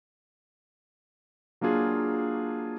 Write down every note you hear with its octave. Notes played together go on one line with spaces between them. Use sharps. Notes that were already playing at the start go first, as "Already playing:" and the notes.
F#3 A#3 D4 F4 G#4